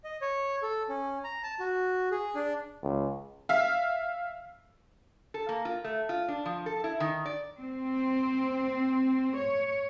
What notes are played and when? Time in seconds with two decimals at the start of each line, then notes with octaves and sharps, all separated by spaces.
0.04 D#5
0.22 C#5
0.63 A4
0.89 C#4
1.24 A#5
1.43 A5
1.60 F#4
2.11 G#4
2.35 D4
2.83 C#2
3.49 E5 F5
5.34 A4
5.49 A#3
5.65 F4
5.84 A3
6.09 F4
6.28 D4
6.45 F3
6.66 A4
6.84 E4
7.00 D#3
7.26 D5
7.58 C4
9.37 C#5